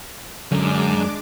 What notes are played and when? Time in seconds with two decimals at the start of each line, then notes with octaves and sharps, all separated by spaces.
0.52 F#2 D3 G#3 D4 D6